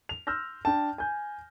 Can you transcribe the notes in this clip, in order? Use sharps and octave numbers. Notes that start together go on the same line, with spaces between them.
F7
C6 E6 F6 G6 A#6
D4 G5 A5
G#5 G6